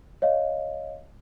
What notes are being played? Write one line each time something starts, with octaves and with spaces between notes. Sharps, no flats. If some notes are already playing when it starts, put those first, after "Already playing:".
C#5 D#5 F5